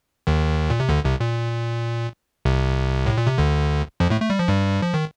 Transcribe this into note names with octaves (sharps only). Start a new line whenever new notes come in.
D#2 D#3
A#2
C3
D2 D3
C2 C3
A#2
C2 C3
A2
A#2
C3
D2 D3
F2 F3
A2 A3
A3
G3
F3
G2 G3
F3
D#3